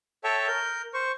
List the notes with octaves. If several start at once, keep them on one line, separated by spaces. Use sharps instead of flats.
A4 C#5 E5 G5 A5 C#6
A#4 G6
C5 C#6